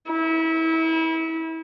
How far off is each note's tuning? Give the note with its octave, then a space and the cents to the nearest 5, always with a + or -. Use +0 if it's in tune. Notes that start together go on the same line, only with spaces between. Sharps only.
E4 -30